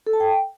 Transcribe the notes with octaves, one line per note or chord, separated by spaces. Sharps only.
A4
A5
G5